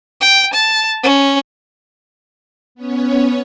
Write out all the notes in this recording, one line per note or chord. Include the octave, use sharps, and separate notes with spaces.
G5
A5
C#4
B3 C#4 C#5